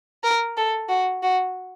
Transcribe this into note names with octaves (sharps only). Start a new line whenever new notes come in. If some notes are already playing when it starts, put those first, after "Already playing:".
A#4
A4
F#4
F#4